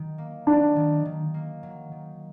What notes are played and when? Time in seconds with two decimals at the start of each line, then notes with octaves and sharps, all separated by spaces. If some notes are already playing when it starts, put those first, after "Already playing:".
Already playing: D#3 F#3
0.18 A#3
0.47 F#3 D4
0.76 D#3
1.05 D#3
1.34 A#3
1.63 F#3
1.92 D#3